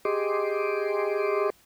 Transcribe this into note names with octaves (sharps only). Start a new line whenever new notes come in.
G4 G#4 D#5 C6 D6